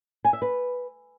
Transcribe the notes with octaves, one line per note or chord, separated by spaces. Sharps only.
G#5
E5
B4